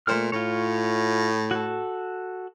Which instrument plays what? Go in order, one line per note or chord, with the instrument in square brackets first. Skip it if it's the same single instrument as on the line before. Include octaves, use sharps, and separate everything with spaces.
[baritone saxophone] A#2 [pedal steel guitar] A3 C5 F6
[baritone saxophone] A2 [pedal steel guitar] F4 C#5
[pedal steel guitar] F#4 A4